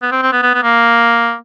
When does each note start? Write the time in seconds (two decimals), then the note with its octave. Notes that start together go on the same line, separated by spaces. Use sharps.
0.02 B3
0.12 C4
0.22 C4
0.33 B3
0.43 B3
0.54 B3
0.63 A#3